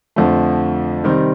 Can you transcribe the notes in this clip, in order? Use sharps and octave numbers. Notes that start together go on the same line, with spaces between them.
F2 D3 F3 A3
C3 D#3 G3 C4